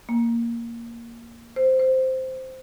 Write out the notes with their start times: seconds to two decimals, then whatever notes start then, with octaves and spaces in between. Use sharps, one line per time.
0.09 A#3
1.56 C5
1.79 C5